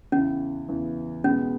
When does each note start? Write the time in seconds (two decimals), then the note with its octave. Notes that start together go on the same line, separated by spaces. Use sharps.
0.12 E2 C#3 E3 C#4
0.68 E2 C#3 E3
1.24 B2 G#3 B3 C#4